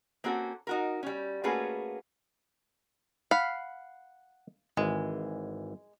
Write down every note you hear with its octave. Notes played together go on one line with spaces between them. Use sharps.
A#3 C4 C#4 F#4 A4
D#4 F#4 A#4
G3 C#4
A3 A#3 C#4 F#4 G#4 B4
F5 F#5 B5
G#1 E3 G#3